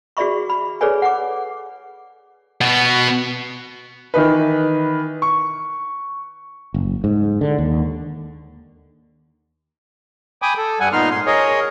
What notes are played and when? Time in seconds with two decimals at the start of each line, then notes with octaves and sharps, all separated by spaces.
0.17 F#4 G#4 D5 E5 B5 C#6
0.50 B5
0.81 G#4 A4 B4 C#5 D5 G#5
1.02 F#5 D6
2.61 B2 B3
4.14 D#3 E3 D#4 B4
5.22 C#6
6.74 F#1
7.04 G#2
7.41 D3
7.58 D#2
10.42 G5 G#5 B5 D6 D#6
10.57 A4
10.80 G2 G3 F#5 G#5
10.92 A#2 B3 D#4 C6 F6
11.11 G#2 C6
11.26 G#4 A#4 C#5 D#5